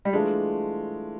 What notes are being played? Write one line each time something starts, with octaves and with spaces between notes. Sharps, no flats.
G3
E3 G#3 A3 D4 F4